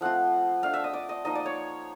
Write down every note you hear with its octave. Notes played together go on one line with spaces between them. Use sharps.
F3 A3 C4 F4 F#5
A3 D4 F4 F5
E5
D#5
D5
D#5
F3 A#3 D#4 D#5
D5
C#5